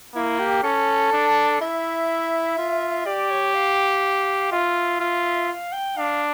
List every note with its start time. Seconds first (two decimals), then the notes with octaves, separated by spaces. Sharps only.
0.15 A#3 E4
0.40 G4
0.64 C#4 A4
1.13 D4
1.61 E4 E5
2.58 F4
3.06 G4 D5
3.31 C#5
3.55 F5
4.52 F4 E5
5.00 F4
5.49 F5
5.73 G5
5.97 D4 F5